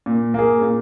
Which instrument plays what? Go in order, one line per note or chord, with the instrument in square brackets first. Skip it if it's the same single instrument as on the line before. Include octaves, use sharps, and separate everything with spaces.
[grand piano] A#2
A#3 G#4
A#2